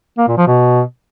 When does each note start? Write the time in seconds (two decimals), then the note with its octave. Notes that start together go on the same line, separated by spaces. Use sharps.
0.18 A#3
0.28 A#2
0.38 F3
0.47 B2